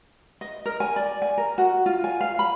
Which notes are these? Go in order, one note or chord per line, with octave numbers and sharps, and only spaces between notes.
D#5
A#4
G#5
D5
G#5
A#4
F#4
F4
G#5
F5
B5